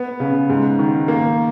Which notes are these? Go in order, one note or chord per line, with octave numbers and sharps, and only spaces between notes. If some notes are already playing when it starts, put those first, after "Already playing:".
Already playing: B3
C#3
G#2
D#3
A#3